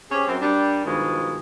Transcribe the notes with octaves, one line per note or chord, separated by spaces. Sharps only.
C#4 G4 G#4 C5 C#5
F#2 C4
G3 A#3 D4
G2 B2 D#3 F3 G#3